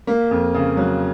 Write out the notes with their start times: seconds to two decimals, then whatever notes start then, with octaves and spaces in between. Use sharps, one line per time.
0.07 A#3
0.31 F2
0.54 C#3
0.77 F#3